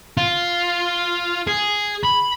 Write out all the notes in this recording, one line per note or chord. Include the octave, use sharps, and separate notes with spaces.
F4
G#4
B5